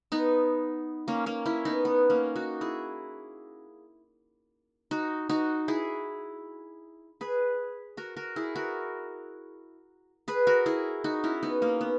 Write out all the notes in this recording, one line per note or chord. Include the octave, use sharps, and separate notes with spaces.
B3 D#4
A#3 C#4
A#3 C#4
C#4 E4
B3 D#4
B3
A#3 C#4
D#4 F#4
E4 G#4
D#4 F#4
D#4 F#4
E4 G#4
G#4 B4
F#4 A#4
F#4 A#4
E4 G#4
F#4 A#4
G#4 B4
F#4 A#4
E4 G#4
D#4 F#4
C#4 E4
B3 D#4
A#3 C#4
B3